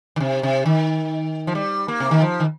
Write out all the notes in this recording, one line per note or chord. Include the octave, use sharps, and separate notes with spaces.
D#3
C3
C3
D#3
F3
G3
A#3
C3
D#3
F3
D#3